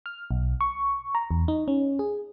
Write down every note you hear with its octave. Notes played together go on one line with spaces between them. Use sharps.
F6
B1
C#6
A#5
E2
D#4
C#4
G#4